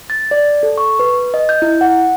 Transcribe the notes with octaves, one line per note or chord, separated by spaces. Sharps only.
A6
D5
A4
C#6
B4
D#5
G6
E4
F#5